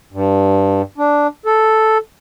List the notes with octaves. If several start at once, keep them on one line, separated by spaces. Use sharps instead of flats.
G2
D4
A4